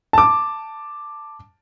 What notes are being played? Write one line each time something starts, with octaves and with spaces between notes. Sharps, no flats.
A5 D6